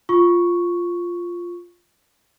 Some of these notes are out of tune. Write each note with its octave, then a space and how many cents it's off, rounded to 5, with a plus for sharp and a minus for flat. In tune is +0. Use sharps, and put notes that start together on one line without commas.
F4 +0 C#6 +0